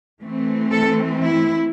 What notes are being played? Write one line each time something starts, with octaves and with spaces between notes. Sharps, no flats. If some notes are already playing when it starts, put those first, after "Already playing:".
E3 A3 C4
A4
E4